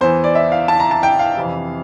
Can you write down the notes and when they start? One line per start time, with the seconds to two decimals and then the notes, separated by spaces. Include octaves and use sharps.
0.01 E2 E3 C5
0.24 D5
0.35 E5
0.52 F5
0.68 A5
0.80 A#5
0.91 A5
1.03 G5
1.19 F5
1.37 F2 C3 E3